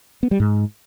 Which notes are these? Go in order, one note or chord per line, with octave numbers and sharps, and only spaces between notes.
B3
G3
G#2